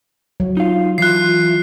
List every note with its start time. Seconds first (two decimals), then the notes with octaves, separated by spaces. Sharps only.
0.40 F#3
0.57 D#4 F4 F5
0.98 E3 F4 F#6 C7